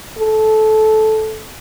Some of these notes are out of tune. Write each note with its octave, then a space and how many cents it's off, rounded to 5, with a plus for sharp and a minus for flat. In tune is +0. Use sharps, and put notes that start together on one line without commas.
A4 -15